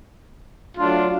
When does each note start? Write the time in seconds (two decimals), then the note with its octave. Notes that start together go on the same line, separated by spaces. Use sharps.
0.76 F#3 A3 D4 F4